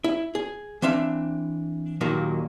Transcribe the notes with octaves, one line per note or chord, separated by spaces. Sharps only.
E4
G#4
E3 C4 D4 E5 F5
D#2 A#2 D#3 F#3 A#3